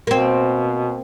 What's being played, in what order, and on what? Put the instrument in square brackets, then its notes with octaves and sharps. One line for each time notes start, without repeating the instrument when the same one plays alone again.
[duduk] B2 [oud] A#3 C4